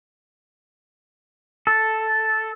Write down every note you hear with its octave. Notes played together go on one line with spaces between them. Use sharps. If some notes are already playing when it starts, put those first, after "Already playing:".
A4